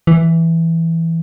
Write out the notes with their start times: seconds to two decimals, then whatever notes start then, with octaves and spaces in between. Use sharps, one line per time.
0.07 E3